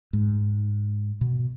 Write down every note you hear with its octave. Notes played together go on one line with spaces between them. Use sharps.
G#2
B2